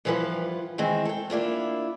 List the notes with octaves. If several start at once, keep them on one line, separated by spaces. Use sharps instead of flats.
G2 E3 F3 F4 B4 F#5
D#3 E3 G#3 C4
A4 G5
A#3 D4 E4 F4